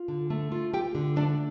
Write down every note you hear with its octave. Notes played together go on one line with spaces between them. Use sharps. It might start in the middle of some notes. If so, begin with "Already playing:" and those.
Already playing: F4
D3
A3
F4
F4 G4 G5
D3
A3 D4 D5